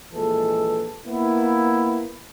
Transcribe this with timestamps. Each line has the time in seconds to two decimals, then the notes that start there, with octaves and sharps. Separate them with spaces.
0.13 A#1 E3 G#3 A4
1.06 A#3 B3 E4